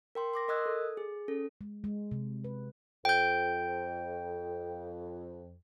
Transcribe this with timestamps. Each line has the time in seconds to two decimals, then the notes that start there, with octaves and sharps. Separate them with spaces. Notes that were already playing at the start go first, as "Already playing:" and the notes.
0.15 A#4 G5 C6
0.33 C6 D6 A#6
0.48 A#4 D#5 D#6 E6 F#6 G#6
0.66 A4
0.97 G#4
1.28 C#4 A4
1.61 G#3
1.84 G#3
2.11 C3
2.44 B4
3.05 F2 G5 G6